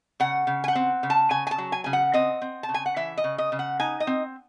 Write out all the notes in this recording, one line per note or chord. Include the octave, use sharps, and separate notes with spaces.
C#3 F#5
C#3
G#5
F#5
C4
C#3
A5
C#3 G#5
G#5
A5
F#3
G#5
C#3 G#5
F#5
C4 D#5
C4
A5
C#3
G#5
F#5
E3 E5
D#5
C#3
D#5
C#3
F#5
D#4 G#5
D#5
C4